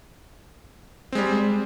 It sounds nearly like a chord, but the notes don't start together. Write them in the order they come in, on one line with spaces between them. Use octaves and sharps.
C4 G#3 G3